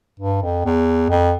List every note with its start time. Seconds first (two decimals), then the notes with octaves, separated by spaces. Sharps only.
0.20 G2
0.42 F2
0.65 E2
1.10 F2